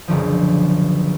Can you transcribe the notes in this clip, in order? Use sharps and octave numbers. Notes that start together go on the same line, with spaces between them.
F#1 B1 D3 F3